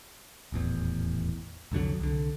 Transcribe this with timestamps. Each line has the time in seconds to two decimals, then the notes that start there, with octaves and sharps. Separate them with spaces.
0.52 D#1 A1 E2
1.72 C2 F2 D3 F#3
2.00 C2 D3